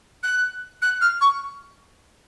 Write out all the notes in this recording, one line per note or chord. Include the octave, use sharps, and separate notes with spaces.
F#6
F#6
F6
C#6